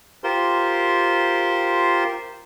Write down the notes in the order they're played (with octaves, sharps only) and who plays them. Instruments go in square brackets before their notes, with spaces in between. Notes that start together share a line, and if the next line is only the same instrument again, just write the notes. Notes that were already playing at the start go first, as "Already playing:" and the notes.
[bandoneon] F4 G4 A#4 C5 C6